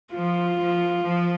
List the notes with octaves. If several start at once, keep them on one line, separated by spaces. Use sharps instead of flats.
F3 F4
F3
F3